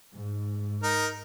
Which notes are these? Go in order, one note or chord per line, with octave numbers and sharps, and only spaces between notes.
G#2
D#4 A#4